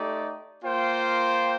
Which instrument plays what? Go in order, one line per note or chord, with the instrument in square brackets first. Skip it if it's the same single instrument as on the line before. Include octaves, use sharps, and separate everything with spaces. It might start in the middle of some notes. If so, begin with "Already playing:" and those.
Already playing: [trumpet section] A3 D#4 G4 D5
A#3 F4 C5 G5